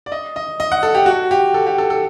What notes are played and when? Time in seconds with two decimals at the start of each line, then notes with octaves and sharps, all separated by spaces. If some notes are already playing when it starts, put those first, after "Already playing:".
0.06 D5
0.12 D#5
0.36 D#5
0.60 D#5
0.72 F#5
0.83 A4
0.95 G4
1.06 F#4
1.31 G4
1.54 A4
1.67 G4
1.78 A4
1.90 A4